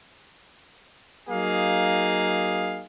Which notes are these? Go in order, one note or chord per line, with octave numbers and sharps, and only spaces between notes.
F#3 A#3 D#4 G#4 F5